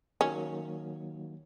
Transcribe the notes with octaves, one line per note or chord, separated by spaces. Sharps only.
D#3 F#3 A#3 C#4